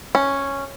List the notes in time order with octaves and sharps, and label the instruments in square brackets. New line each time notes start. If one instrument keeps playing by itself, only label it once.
[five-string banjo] C#4